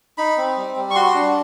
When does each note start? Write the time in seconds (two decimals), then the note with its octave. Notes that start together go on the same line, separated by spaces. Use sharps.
0.18 D#4 B5
0.38 C4
0.57 G3
0.76 G3
0.90 C#6
0.95 F#4 C6
1.15 D4